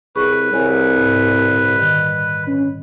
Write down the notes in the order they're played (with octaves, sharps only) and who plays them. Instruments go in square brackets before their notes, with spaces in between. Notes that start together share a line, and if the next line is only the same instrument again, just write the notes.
[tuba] C2 [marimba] G#4 C#6 [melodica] B4
[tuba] C2 [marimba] C#5 G#5
[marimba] G#2
A#2 D3
D#3 G3 F#6
[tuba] C#4